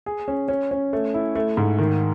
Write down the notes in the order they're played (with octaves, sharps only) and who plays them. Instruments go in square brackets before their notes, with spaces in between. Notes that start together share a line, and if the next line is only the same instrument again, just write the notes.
[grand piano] G#4
C#4
C#4
C#4
A3
E4
A3
G#2
D#3